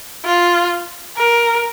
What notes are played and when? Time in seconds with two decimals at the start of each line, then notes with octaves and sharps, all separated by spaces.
0.25 F4
1.16 A#4